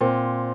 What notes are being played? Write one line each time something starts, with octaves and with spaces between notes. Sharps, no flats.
A#2 C4